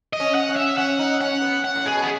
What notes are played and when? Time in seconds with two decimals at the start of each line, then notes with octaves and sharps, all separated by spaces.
0.13 D#5
0.20 C#4
0.35 F#5
0.49 C#4
0.56 E5
0.77 C#4 F#5
0.99 D#4
1.21 C#4 F#5
1.42 B3
1.64 F#5
1.76 A2
1.86 B2 G#4
2.03 B3